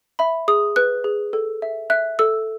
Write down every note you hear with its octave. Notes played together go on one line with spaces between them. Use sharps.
E5 B5
G#4 D#6
B4 F#6
G#4
A4
E5
E5 F#6
A4 E6